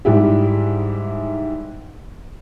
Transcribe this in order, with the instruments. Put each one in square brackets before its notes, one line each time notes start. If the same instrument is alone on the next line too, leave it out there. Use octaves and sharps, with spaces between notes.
[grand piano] G#2 G3 E4 G4